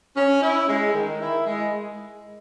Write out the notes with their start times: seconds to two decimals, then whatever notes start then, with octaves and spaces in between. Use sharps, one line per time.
0.16 C#4
0.42 E4
0.68 G#3
0.94 D#3
1.20 E4
1.46 G#3